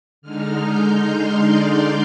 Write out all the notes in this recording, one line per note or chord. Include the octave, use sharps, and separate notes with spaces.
D3 G#3 D#4 F6
G6
C6
D5